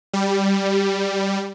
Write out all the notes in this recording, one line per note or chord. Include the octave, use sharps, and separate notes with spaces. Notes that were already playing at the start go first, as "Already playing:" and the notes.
G3